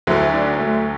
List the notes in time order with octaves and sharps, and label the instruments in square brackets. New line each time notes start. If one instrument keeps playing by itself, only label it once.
[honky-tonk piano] D2 D3 F#3 [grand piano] E4
[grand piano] D4
A3